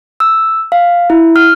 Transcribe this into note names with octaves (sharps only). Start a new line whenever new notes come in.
E6
F5
E4
F6